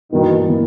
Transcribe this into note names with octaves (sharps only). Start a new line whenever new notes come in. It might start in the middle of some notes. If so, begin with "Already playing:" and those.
G2 B2 D#3 E3 A#3
E3 A#3